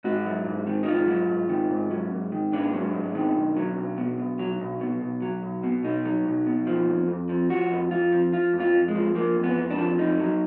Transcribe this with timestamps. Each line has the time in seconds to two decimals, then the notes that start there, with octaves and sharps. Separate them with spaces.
0.04 G#2 F#4
0.26 F#3
0.46 G#2
0.67 D#3
0.83 D#4
0.87 G#2 F4
1.08 F#3
1.29 G#2
1.49 D#3
1.70 G#2
1.90 F#3
2.11 G#2
2.32 D#3
2.52 G#2 D4
2.73 F#3
2.94 G#2
3.15 D#3
3.35 B1
3.57 F#3
3.77 B1
3.98 B2
4.18 B1
4.39 F#3
4.60 B1
4.81 B2
5.01 B1
5.22 F#3
5.43 B1
5.63 B2
5.84 B1 D#4
6.05 F#3
6.26 B1
6.46 B2
6.67 F3
6.88 F2
7.08 F2
7.29 F3
7.50 F3 F#4
7.70 F2
7.91 F2 F4
8.12 F3
8.33 F3 F4
8.53 F2
8.60 F4
8.74 F2
8.88 G#3
8.95 F3
9.15 F3 A#3
9.36 F2
9.43 B3
9.57 F2
9.71 D4
9.78 F3
9.98 F2 D#4
10.19 F#3